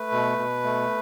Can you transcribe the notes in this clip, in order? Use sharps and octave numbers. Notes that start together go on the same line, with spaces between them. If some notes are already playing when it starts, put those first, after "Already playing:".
Already playing: A3 B4
B2
B2
A3